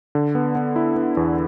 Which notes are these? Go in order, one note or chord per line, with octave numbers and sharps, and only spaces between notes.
D3
B3
B3
E4
B3
E2